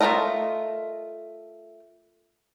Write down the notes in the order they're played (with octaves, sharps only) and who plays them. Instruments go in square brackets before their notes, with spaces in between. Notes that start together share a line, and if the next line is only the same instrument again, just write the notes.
[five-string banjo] A3 D#4 F4 A#4 D#5